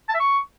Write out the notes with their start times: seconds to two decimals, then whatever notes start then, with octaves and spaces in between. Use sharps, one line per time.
0.09 A5
0.14 E5
0.20 C#6